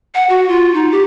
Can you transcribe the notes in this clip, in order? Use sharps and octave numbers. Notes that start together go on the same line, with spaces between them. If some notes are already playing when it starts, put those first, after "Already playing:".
F#5
F#4
F4
D#4
G4